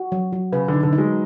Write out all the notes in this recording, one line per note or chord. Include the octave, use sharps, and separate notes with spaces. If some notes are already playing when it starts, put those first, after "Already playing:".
Already playing: F#4
F#3
F#3
C#3 B4
D3 D#4
D3
D#4
F#3 G#3